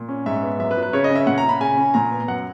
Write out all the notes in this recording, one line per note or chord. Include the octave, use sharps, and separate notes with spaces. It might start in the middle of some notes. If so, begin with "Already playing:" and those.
Already playing: A#2
C#4
G#2 E5
B3
F#2 E5
B4
F#3
B4
C#3 C#5
D#5
C#4
E5
A#2 F#5
A#5
C#4
B5
C#3 G#5
C#4
A#2 A#5
B3
F#2 F#5